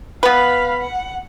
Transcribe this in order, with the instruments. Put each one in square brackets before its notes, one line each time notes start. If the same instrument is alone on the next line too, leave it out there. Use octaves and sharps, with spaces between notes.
[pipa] B3 B4 [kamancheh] F5 B5
[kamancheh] F#5